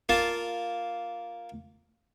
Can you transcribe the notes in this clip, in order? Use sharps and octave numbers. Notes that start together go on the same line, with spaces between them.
A#3 F4 A5